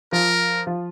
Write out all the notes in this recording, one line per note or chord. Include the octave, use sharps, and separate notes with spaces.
F3 F4 A#4
F3 F4